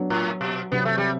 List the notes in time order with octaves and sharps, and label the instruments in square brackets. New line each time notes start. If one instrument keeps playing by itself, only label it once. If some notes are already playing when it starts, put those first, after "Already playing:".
Already playing: [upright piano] F#3 B3 D4
[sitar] A2
B2
[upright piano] C3 F#3 C4 [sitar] B3
[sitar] A3
G3